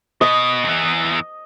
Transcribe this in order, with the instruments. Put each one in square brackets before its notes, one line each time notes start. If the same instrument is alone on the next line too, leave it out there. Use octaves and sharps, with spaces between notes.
[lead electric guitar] B2 [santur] D#5
[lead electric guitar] E2 E3